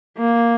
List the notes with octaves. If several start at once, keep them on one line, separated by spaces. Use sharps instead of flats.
A#3